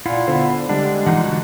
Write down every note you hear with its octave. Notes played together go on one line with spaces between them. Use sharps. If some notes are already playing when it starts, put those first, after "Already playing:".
A#2 E4 F4 F#5
D3 B3 C5
D3 G3 G#3 D4
E3 F3 D#4 F#5
D3 F#4